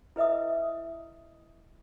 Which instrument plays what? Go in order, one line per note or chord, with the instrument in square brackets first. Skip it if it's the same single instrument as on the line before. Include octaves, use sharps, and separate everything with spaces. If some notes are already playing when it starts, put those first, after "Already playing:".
[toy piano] E4 B4 D#5 E5 D#6